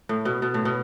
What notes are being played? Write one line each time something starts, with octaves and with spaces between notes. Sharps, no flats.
A2
B2
B2
A2
B2